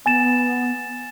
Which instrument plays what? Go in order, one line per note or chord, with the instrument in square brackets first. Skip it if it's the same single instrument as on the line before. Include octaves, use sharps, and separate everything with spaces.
[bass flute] B3 [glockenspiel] G#5 A6 E7